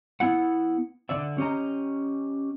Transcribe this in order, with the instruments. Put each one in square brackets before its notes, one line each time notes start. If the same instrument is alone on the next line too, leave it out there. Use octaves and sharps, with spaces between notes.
[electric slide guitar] B3 E4 F#5
D3 D5 E5
C#4 G4 D#5 A#5